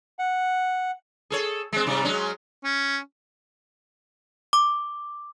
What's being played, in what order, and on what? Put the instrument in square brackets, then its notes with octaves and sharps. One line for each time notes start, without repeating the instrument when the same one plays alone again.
[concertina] F#5
[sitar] G#4 A4 C#5
G#3 C4
G#2 C3 G3
F#3 G#3 C#4
[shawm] C#4
[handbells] D6